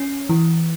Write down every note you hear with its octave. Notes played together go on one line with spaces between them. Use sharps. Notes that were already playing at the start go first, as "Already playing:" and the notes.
Already playing: C#4
E3